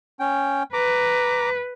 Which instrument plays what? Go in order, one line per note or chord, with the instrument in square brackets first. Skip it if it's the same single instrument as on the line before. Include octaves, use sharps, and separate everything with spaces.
[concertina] C#4 G5
[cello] B4 [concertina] A#5 D6